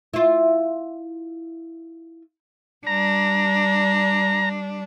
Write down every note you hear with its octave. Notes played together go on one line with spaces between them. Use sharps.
E4 F4
G3 D4 A#5